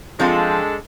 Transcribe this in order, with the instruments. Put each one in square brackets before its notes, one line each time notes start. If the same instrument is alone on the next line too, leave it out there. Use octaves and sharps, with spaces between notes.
[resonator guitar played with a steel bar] F3 C4 F4 [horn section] G#3 D4 A4